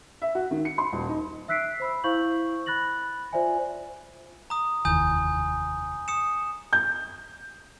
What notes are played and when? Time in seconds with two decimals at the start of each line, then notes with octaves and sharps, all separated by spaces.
0.22 E5
0.35 F#4
0.51 D#3
0.65 C#7
0.78 C6
0.92 D#1
1.09 D#4
1.48 E5 E6 F#6 B6 C7 D7
1.80 C5 B5 E6
2.04 E4 C5 F5 C#6 G6 F#7
2.66 B5 F#6 A6 A#6 F#7
3.33 F4 C5 D5 E5 G#5
4.50 A#5 D#6
4.85 F1 D#2 E3 G#5 D#6 G6
6.08 D#6 C#7 E7
6.73 G6